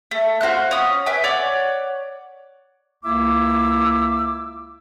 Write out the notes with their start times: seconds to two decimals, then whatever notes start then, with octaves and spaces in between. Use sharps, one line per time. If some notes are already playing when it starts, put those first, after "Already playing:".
0.11 A3
0.41 F4 F#4 C5 F#6
0.71 C#4 D#6
1.06 B4 E5 G5 G#5
1.24 C#5 D5 F#5 D6
3.04 C#2 A#3 E4 E5 D6 E6